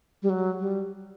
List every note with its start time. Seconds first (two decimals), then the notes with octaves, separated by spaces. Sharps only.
0.23 G3
0.29 F#3
0.59 G3